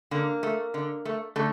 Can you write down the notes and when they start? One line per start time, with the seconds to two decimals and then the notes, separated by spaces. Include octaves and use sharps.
0.11 D3 A#3
0.43 A3
0.74 D3
1.05 A3
1.36 D3 A3